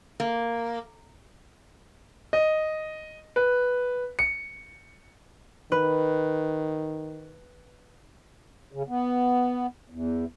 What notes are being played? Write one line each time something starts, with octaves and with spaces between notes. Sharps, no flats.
A#3
D#5
B4
C#7
D#3 B4
C#3
B3
E2